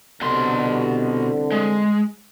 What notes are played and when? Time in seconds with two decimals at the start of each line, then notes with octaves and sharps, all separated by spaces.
0.21 C2 B2 D3 C6
1.52 G#3